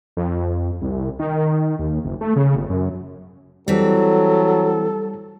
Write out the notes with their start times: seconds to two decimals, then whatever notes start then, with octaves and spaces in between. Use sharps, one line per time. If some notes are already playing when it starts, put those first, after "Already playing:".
0.17 F2
0.81 C2
1.19 D#3
1.79 D#2
2.05 F#1
2.21 A3
2.36 C#3
2.56 G1
2.70 F#2
3.68 E3 F#3 G3 C4 A4